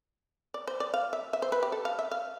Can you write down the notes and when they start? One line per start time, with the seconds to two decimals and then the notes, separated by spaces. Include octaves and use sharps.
0.54 D5
0.67 C5
0.80 D5
0.94 F5
1.13 E5
1.33 E5
1.42 C5
1.52 B4
1.63 G4
1.72 A4
1.85 F5
1.99 E5
2.11 F5